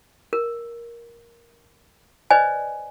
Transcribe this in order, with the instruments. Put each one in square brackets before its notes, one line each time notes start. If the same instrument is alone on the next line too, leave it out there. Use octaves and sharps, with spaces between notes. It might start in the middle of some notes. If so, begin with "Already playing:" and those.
[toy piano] A#4
B4 C5 D5 D#5 G#5